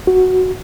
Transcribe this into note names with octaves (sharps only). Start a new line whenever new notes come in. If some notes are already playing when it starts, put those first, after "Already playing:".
F#4